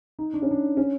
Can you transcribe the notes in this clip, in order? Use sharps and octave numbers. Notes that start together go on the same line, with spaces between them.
D#4
D4
C#4
D4
C#4